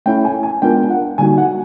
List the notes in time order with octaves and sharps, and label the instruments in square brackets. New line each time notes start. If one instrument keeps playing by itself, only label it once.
[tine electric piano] A3 C#4 E4 [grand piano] G5
[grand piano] G#5
G#5
[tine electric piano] G#3 B3 D4 F4 A#4 [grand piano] G5
[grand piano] F#5
[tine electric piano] D3 G3 A#3 D#4 F#4 [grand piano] G#5
[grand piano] F#5